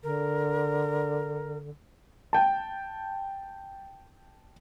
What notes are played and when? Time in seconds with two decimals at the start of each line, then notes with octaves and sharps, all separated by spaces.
0.03 D3 A#4
2.33 G5 A5